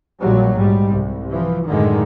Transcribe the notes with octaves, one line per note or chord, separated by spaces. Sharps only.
A#1 A#2 F#3 G3
G#2 G3
C2
E3 F3
F#2 A2 D3 D#3 G#3